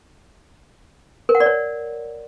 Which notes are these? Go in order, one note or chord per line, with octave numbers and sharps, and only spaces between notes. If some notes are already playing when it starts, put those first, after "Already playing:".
A#4
F#5
D5
C#5